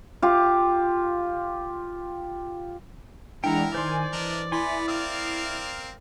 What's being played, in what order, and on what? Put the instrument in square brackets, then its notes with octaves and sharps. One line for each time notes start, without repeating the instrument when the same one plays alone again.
[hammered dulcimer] F4 G4
[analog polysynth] E3 G#3 D4 [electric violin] E4 A#5 [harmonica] A#4 [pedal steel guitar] F#5 G5
[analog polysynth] D#3 G#5 [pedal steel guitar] C5 C6 [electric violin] D5
[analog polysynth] E3 [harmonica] D4 A#4 D#5
[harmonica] B3 B5 [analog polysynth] E4 [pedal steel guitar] G#5 C6
[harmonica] C4 A#4 F5 [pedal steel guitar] D#6